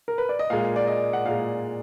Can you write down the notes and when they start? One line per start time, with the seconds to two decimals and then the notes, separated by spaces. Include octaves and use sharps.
0.08 A#4
0.18 B4
0.29 D5
0.39 D#5
0.50 A#2 G#3 F5
0.76 D5
0.87 D#5
1.13 F#5
1.25 A#2 G#3 F5